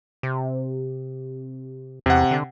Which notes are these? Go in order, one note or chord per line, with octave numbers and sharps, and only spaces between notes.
C3
E2 C3 F#5
D3